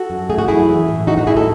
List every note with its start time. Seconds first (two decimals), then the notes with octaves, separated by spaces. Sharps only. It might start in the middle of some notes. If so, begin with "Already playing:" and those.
Already playing: F#4 A4
0.10 F#2
0.30 A3 G#4
0.39 F#4
0.48 F#2 E4 G#4
0.68 E3
0.88 A2
1.07 A2 D#4 F#4
1.18 D#4 F#4
1.27 A2 E4 G#4
1.36 F#4 A4